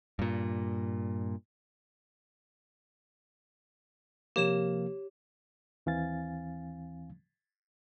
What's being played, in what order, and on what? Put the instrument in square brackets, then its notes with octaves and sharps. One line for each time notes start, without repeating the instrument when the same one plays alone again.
[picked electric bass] G2 A#2
[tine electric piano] C3 F3 A#3 [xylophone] G4 C#5 E7
[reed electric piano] D#2 E3 C4 F5 G#5 A6